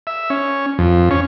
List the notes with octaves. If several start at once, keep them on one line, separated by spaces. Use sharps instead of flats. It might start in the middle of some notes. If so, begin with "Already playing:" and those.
E5
C#4
F2
C#4